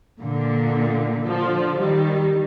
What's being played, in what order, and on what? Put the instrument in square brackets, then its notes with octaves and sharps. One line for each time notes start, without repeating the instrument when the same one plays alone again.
[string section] A#2 D3
D3 F3
D#3 G3